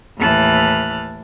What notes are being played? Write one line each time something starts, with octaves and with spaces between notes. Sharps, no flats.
D#2 A2 E3 A5 F6 F#6